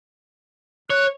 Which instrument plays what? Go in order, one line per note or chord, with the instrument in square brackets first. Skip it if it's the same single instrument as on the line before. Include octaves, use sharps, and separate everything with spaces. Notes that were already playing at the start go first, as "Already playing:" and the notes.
[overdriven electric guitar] C#5 [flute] F#6